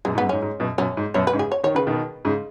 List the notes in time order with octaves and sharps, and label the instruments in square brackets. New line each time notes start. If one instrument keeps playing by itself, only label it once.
[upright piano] F#2 B2 [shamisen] G#3
[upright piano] G#2
[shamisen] B3
[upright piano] F#2
[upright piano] G#2 [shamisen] C#4
[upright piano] G#2
F#2 B2
[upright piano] F#2 B2 [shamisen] C#4
[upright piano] G#2
[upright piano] F#2 B2 [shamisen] C#5
[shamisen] B4
[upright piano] G#2 C#3
[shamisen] G#4
C#5
[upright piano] D#3 [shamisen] C#5
[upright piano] C#3 [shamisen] B4
[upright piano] B2 D#3
G#2 C#3